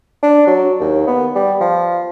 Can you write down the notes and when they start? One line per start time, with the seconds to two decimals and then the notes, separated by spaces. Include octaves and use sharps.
0.23 D4
0.47 F#3
0.80 D#2
1.07 B3
1.35 G3
1.61 F3